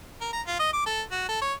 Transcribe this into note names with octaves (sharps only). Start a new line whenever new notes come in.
A#4
A#5
F4
D#5
D6
A4
F#4
A4
C#5